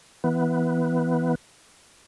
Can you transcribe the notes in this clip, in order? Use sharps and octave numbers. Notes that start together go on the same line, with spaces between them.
E3 B3